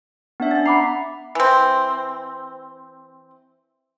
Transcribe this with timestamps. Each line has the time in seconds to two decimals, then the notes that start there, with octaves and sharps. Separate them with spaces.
0.40 B3 D4 E5
0.51 C#4 E5 A6
0.66 F#5 A#5 B5 D6 C7
1.35 E3 C4